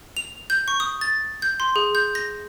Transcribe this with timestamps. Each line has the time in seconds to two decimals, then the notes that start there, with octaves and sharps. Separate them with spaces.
0.17 F7
0.50 G6
0.68 C#6
0.80 D#6
1.01 A6
1.42 G6
1.60 C6
1.76 G#4
1.95 G6
2.15 A#6